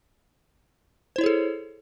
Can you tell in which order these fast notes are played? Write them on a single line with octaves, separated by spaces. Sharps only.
C5 E4 C#5 G#4 A4